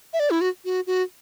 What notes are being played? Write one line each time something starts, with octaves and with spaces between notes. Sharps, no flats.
E5
D5
E4
F#4
F#4
F#4